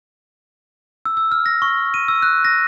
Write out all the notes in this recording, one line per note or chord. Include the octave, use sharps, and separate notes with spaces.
E6
E6
F6
A#6
C#6
D#7
E6
F#6
A#6